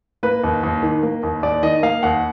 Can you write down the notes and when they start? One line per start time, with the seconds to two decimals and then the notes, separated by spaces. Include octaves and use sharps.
0.23 A#3 B4
0.44 D#2
0.63 D#2
0.83 D#3
1.03 A#3
1.23 D#2
1.42 D#2 D5
1.63 D#3 D#5
1.83 A#3 F5
2.03 D#2 F#5